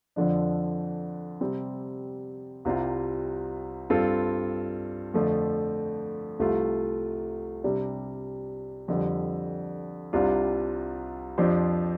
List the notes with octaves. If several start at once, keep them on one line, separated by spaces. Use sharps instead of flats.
F2 D3 F3 D4
C3 G3 C4
C2 C3 G3 F4
G2 G3 C4 F4 A4
F2 D3 F3 A3
C2 C3 A3 F4
C3 G3 D4
F2 D3 G3
C2 C3 G3 D4 F4
F2 F3 D4 G4 C5